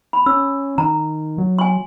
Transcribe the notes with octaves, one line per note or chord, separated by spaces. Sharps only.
B5
C#4 E6
D#3 A#5
F#3
G#5 C6